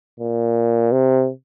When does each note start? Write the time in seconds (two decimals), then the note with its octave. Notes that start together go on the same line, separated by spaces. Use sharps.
0.20 A#2
0.92 C3